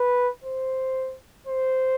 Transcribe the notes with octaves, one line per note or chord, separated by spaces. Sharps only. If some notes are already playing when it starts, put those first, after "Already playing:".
Already playing: B4
C5
C5